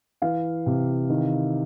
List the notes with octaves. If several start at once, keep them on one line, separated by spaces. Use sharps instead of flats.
E3 F5
C3
D#3